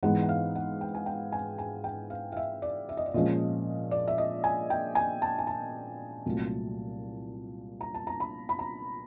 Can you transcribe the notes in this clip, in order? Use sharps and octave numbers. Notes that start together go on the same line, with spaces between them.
G#2 E3 G#3 B3 D#4 F#5
F#5
F5
F#5
G5
G#5
G5
G#5
G#5
G5
F5
F5
E5
D5
E5
D#5
D5
A#2 F3 G#3 C#4 D#5
D5
E5
D#5
G#5
G5
G#5
A5
G#5
A5
C2 A#2 F#3 A3
A#5
A5
A#5
B5
B5
A#5